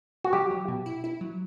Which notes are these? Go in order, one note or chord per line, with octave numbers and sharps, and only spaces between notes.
F#4
F#3 G4
F#3
B2
E4
E4
F#3